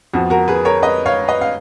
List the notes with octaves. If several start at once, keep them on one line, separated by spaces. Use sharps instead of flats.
F2 F3 B3 F#4
F#4 A#4
G#4 B4
A#4 C#5
B4 D#5
C#5 F5
B4 D#5
F5